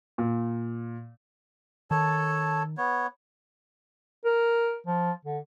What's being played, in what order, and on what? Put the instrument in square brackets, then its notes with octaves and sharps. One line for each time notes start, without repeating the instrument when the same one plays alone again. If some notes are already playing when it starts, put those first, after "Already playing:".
[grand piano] A#2
[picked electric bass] D#3 [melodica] A4 C#5 A5
[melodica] B3 C#5
[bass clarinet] A#4
F3
D3